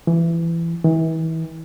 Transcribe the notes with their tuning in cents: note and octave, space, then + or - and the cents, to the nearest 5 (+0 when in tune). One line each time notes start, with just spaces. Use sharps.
E3 +20
E3 -35